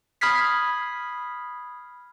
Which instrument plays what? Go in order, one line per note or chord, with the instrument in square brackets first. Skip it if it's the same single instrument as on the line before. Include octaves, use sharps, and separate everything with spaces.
[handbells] B5 D#6 F6 G#6 B6 C7